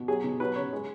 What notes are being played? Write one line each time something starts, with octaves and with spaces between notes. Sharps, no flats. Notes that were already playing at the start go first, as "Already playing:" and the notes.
Already playing: B2
F#3 G#4
B2
F#3 B4
C#3 C#5
G#3